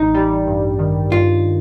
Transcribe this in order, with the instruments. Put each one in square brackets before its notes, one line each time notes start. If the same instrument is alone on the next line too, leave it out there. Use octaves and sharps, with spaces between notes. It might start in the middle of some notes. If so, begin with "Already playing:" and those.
Already playing: [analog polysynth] A1 [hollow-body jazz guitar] D#4
[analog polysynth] G3
G2
D#3
[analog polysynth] G2 [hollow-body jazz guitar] F4